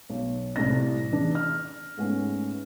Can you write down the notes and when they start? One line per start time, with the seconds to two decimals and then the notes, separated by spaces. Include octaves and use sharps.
0.10 B1
0.56 C2 A2 C3 A#6
1.11 E2 D4
1.35 F6
1.97 G#2 A3 B3 C#4